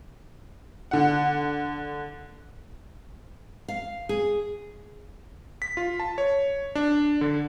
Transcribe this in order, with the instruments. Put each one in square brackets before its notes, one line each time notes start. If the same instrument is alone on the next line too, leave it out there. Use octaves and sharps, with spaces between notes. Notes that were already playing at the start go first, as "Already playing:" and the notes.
[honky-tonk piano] D3 F#5
[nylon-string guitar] F5
G#4
[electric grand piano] B6
F4
A5
C#5
D4
D3